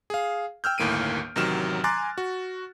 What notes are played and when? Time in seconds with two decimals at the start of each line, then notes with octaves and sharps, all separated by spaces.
0.10 G#4 F5
0.64 G5 E6 F6 G6
0.78 G1 D#2 A2 A#3 D7 D#7
1.36 A1 C3 D#3 F#3 F6 E7
1.84 G#5 A#5 C6 D6 F#6 A6
2.18 F#4